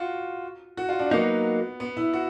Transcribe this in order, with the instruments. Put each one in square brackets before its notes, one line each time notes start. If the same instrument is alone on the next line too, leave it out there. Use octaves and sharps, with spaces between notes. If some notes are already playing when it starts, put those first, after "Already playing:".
Already playing: [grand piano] F4 F#4
F#4
F4
D4
[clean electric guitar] F#3 A#3 D#4 [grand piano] B3
[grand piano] B3
E4
F#4